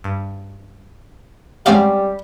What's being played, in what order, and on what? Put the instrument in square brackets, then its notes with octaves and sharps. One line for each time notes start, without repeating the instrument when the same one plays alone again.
[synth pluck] G2
[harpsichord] G#2 D5 F#5 [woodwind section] G3 [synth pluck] C4 C#4 F5